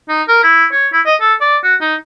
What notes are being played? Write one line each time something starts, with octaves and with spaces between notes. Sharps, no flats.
D#4
A#4
E4
C#5
E4
D#5
A4
D5
F#4
D#4